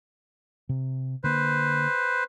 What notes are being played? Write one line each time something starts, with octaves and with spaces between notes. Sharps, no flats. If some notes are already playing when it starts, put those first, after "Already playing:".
C3
D3 A#3 B4 C5